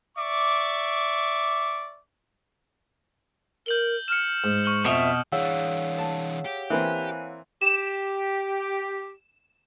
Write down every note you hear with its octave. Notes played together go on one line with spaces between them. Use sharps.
D5 E5 C#6 D6
A#4 G6 F#7 G7
F6 C#7 E7
G#2
C#6 F6 F#7
F2 B2 E5
E3 D4 G#4 C#5 F5 F#5 E6
A5
G4
E3 A#3 C4 G#5 B5 F#6
G4 E7